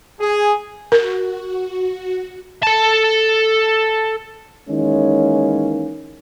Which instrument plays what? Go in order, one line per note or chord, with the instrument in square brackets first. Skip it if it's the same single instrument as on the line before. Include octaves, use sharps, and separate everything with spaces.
[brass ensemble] G#4
[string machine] F#4 [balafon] A#4
[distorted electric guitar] A4 A5
[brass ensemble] D#3 E3 G#3 A#3 C#4